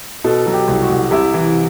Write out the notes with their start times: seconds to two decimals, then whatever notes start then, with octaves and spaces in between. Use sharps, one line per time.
0.24 B2 A4
0.46 F#3
0.54 G4
0.68 C2
0.82 F#4
0.90 C2
1.11 C3 E4
1.34 E3